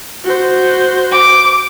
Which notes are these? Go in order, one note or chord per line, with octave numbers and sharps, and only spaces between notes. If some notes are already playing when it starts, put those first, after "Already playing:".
F#4 C5
D6